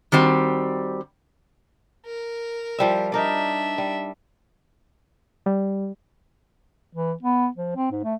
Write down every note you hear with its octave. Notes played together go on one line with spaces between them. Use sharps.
D#3 G3 C4 F#4
A#4
F3 G3 E5
D4 D#4 A#4 D5 E5
G3
G3
E3
B3
F3
C4
G#2
A3